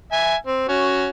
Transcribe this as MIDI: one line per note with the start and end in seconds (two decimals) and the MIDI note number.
0.12 0.35 76
0.12 0.35 80
0.47 0.65 60
0.69 1.08 61
0.69 1.08 66